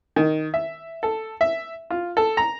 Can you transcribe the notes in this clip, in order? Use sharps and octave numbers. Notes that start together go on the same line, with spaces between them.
D#3
E5
A4
E5
F4
A4
A#5